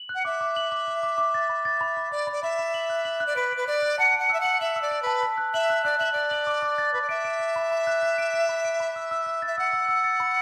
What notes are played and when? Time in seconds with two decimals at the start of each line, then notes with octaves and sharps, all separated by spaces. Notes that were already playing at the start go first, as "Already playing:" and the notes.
Already playing: F#7
0.09 F#6
0.15 F#5
0.25 E5 D6
0.41 D6
0.56 F#7
0.72 D6
0.88 D6
1.03 D6
1.18 D6
1.34 A6
1.50 B5
1.65 A6
1.81 B5
1.97 B5
2.11 D5 B5
2.27 B5
2.32 D5
2.43 E5 B5
2.59 B5
2.74 F#7
2.90 F#6
3.05 F#7
3.20 F#6
3.26 D5
3.36 B4 D7
3.52 B4 D7
3.67 D5 F#6
3.82 F#6
3.98 F#5 A5
4.14 D7
4.19 F#5
4.30 E5 E6
4.40 F#5 F#7
4.60 E5 F#7
4.76 E6
4.82 D5
4.91 D7
5.02 B4 A5
5.23 B6
5.38 F#6
5.54 E5 F#7
5.70 F#6
5.84 D5 F#6
5.98 E5 F#7
6.12 D5 F#6
6.31 F#7
6.47 D6
6.62 D6
6.78 A6
6.93 B4 D6
7.02 D5
7.09 E5 D7
7.25 D7
7.40 D7
7.56 B5
7.71 B5
7.87 F#6
8.02 F#6
8.18 D7
8.34 D7
8.49 B5
8.65 D7
8.80 B5
8.96 E6
9.11 E6
9.26 E6
9.42 E5 A6
9.58 F#5 E6
9.73 E6
9.89 E6
10.04 A6
10.20 B5